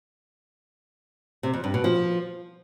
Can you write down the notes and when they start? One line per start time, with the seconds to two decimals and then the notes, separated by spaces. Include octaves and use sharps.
1.43 C3
1.54 F2
1.64 G2
1.74 B2
1.84 F3